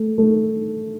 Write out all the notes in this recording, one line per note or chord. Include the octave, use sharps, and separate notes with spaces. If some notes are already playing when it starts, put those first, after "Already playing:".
Already playing: A3
A3